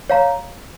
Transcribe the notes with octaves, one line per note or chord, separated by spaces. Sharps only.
C#5 F5 A#5